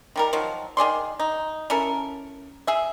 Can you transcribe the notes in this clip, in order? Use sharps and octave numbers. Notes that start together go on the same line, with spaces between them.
D#3 G3 A#4
D#3 F3 F#3
D#3 G#4 D5 C6
D#4
C#4 E4 A4 A#4
G#4 E5